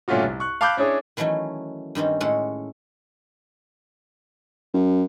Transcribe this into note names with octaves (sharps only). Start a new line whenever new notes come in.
G2 A#2 A3 C#4 F4 F#4
C2
C#6 F#6
F5 A5 B5 D6 F#6 G6
C#4 D4 E4 G#4 C#5
D#3 E3 F#3 A3 C#4
G2 D#3 C4 C#4
A2 G#3 C#4 A4 F#5
F#2